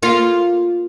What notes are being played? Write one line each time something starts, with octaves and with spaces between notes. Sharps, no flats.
A#3 F4